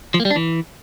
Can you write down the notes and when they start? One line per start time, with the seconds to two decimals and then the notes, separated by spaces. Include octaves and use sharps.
0.14 F3
0.20 A#3
0.25 G3
0.31 D4
0.36 E3